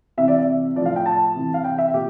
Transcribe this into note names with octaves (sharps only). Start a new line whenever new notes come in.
C3 E3 E5
D5
E5
A2 F3 D5
F5
G5
A5
C3 E3
F5
G5
E5
A#2 G4